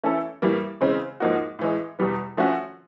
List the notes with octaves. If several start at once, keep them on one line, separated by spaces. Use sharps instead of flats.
E3 A3 C#4 E4 A4
A2 E3 G3 A#3
C#3 E3 G#3 C4
G#2 F3 A#3 D#4 F#4
A2 E3 G#3
E2 B2 G3 B3
F3 A3 C#4 F#4